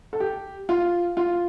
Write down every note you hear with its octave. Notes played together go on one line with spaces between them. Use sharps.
A4
G4
F4
F4